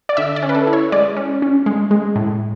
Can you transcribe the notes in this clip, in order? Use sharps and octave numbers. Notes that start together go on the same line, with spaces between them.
D5
D3 E5
D5
C#4
B4
A4
E4
C#5
G#3 D5
C#4
C#4
G#3
G#3
A2